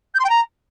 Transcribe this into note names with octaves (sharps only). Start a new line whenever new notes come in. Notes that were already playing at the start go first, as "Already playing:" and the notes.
G6
C6
G5
A#5